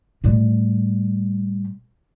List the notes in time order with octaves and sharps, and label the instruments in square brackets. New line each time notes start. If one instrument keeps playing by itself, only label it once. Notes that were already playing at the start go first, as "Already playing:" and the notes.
[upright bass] A2 G3